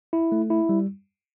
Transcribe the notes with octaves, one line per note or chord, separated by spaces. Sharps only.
E4
A3
E4
G3